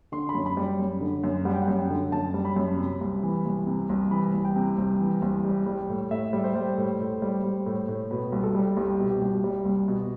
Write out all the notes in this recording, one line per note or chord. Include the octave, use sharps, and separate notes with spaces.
D3 C6
B5
F#2
B5
G3
F#2
D3
F#2
G3 F#5
G5
F#5
F#2
G5
D3
F#2 A5
G3
B5
F#2
C3
C2
E3
C2
C3
C2
E3 B5
C2
G5
C3
C2
E3
C2
G3
G3
A2
A2 E5
G3
C5
G3
A2
A2
G3
G3
A2
A2
B2 B4
C2
A4
G3
C2 G4
B2
G4
C2
G3
C2
B2